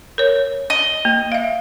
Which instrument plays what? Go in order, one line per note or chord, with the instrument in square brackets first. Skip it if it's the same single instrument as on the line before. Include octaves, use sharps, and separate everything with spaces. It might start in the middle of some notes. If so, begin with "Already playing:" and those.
[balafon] A#4 C#5
[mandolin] D#5
[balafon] A#3
E5 F5